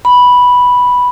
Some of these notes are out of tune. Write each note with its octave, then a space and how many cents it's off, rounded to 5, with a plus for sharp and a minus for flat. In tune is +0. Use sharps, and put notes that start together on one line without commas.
B5 -5